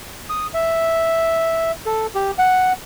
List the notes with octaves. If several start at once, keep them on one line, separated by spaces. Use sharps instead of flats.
D#6
E5
A4
G4
F#5